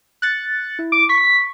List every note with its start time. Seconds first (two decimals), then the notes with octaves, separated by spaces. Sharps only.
0.22 F#6 A6 C#7
0.79 E4
0.92 D6
1.09 C#6 B6